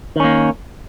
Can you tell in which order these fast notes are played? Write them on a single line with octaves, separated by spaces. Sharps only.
D#3 C#4 A#3